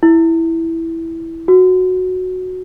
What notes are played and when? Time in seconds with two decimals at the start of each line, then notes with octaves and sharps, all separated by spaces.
0.03 E4
1.48 F#4